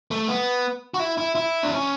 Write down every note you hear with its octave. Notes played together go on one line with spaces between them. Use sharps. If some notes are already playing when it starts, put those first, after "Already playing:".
A3
B3
F#4
E4
E4
E4
D4
C#4